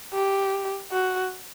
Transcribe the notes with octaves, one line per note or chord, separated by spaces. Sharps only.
G4
F#4